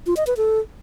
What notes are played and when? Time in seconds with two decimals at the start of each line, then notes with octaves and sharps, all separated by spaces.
0.07 F4
0.17 D#5
0.27 B4
0.37 A4